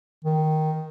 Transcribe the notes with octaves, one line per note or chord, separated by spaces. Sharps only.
D#3